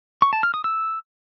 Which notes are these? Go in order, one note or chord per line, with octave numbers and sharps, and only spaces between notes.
C#6
A5
F6
D#6
E6